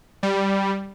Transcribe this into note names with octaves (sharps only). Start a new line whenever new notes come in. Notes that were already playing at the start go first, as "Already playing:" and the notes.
G3